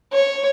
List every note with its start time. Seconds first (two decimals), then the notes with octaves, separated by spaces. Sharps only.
0.13 C#5